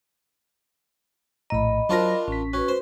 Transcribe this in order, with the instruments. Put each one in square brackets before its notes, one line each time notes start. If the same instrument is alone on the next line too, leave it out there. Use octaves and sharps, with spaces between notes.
[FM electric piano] A#1 A2 A#5 [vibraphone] D#5 B5
[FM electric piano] F#3 C5 A#6 [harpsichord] D4 F4 A#4
[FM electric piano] A1 B6 [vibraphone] C#4
[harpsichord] C#4 [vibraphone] F#4 B4
[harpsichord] C5